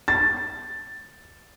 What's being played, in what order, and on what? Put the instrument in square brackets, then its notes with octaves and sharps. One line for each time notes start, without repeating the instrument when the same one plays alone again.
[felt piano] A6